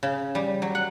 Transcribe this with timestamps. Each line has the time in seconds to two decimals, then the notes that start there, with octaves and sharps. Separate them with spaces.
0.03 C#3
0.35 G3
0.62 F#3
0.75 F#5